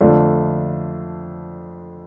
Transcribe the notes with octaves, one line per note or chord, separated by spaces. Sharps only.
F2 D3 A3 D4 F4